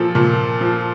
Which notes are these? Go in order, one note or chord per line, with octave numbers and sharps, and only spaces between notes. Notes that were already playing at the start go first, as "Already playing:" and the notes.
Already playing: A#2 F3 A4
A#2
F3